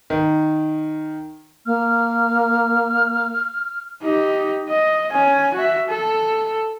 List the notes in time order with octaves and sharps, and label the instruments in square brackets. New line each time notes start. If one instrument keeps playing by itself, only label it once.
[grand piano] D#3
[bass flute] A#3 [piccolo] F6
[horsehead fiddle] D#4 G4
D#5
C#4 G#5
F#4 E5
A4